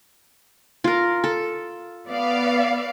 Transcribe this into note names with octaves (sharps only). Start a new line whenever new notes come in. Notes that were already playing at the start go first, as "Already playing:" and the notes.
F4 A#4
A4
B3 D5 F5